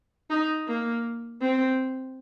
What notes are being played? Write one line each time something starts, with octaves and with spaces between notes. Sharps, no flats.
D#4
A#3
C4